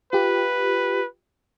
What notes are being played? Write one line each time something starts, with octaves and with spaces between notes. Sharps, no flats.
F4 G4 B4